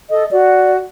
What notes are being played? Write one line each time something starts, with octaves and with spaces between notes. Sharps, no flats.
A4 D#5
F#4 D5